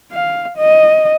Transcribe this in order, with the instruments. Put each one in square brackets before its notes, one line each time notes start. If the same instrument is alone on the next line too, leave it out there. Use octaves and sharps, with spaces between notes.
[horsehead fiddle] F5
D#5